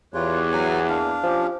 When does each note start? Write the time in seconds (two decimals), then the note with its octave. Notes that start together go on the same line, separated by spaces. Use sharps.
0.14 E2 F4 G4 B4 C#5
0.53 F#3 G#5
0.89 E3 A#3 D4 F5
1.23 F3 C#4 G4